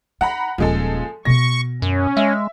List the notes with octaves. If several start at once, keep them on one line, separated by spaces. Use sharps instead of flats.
D#4 F#5 A#5 B5
D#1 F3 G#3 D#4 A4
B2 B3 C#6 A#6
F#2 C#4
G#3 E5